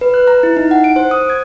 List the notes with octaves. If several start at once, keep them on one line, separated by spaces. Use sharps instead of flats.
B4
F#6
A#5
E4
D#4
F#5
D7
C5
D#6
G#6